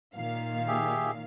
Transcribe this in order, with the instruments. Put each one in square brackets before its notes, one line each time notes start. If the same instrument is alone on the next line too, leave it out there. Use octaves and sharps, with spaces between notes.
[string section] A#2 D#3 F5
[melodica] G4 G#4 E5